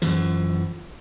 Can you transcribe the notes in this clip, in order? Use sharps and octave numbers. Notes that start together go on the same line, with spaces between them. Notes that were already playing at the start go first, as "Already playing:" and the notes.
F#2 E3 F3